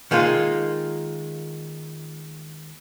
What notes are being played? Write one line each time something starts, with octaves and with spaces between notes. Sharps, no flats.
D#3 G#3 A#3 F4